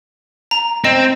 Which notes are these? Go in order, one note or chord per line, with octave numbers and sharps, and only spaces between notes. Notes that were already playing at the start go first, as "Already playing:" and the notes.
A#5
C4 D#5